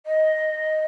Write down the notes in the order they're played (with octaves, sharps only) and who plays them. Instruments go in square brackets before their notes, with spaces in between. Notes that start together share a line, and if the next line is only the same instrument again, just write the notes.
[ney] D#5